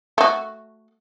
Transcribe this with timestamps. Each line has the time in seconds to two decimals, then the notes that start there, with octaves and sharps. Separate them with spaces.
0.18 A3 F#4